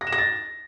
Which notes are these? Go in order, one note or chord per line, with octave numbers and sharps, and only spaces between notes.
A#6
E7
A#6
A6